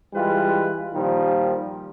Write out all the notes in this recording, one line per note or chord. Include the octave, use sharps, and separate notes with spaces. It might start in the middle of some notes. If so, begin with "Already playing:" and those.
E3 G3 G#3 F4 B4
A#2 D#3 F3 G3